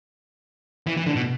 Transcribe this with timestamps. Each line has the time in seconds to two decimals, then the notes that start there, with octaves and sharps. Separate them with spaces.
0.87 E3
0.97 E3
1.06 D3
1.16 B2